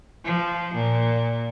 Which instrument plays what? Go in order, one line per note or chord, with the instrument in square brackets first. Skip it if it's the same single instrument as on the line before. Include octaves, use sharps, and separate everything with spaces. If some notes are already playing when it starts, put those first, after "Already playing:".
[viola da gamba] F3
A#2